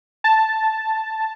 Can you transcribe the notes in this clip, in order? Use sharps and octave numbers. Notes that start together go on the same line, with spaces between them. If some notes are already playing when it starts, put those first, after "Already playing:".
A5